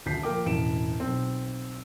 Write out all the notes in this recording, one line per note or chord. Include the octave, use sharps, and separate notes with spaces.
D#1 D2 G6 B6 C7
F3 A#3 A#4 G5 D6
E1 A1 D7 E7
B1 C4